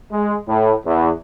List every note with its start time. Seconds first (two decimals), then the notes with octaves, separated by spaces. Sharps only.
0.12 G#3
0.47 A2
0.86 E2